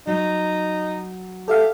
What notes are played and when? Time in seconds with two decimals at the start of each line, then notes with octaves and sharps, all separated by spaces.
0.07 F#3 D#4
1.48 G4 A4 E5 F5